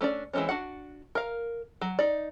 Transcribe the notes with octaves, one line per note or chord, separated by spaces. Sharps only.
A3 C#4 D4 D5
E3 G#3 A3 C4 C#4
D4 F#4 F#5
A#4 F5
F#3
D#4 D5